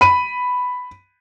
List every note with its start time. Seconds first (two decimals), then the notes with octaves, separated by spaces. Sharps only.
0.01 B5 D#7